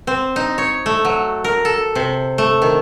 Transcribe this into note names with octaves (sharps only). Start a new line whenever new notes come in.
C4
D#4
C#5
A3
F#3
A#4
A4
C3
A3
D#3